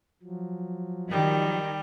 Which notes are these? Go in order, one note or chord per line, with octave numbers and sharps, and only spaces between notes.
F3 F#3
D#3 G3